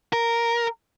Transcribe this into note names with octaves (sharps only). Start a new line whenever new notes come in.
A#4